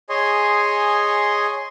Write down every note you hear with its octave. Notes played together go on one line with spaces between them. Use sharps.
G#4 C#5 D#5 G#5 C6